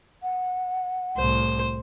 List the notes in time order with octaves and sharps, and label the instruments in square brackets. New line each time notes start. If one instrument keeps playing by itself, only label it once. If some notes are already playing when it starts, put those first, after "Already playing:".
[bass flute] F#5
[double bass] C2 A2 [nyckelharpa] C5